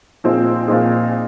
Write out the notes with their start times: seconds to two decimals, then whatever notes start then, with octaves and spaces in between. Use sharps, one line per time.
0.24 A#2 F3 C4 D#4 G#4
0.68 A#2 F3 C4 D#4 G#4